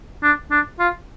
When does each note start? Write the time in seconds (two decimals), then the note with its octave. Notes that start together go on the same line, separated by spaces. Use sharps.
0.23 D4
0.51 D4
0.79 F4